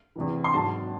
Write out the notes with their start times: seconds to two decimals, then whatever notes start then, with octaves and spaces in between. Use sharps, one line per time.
0.16 E2 C3 E3
0.44 C6
0.53 G#1 G#2 F#3 A5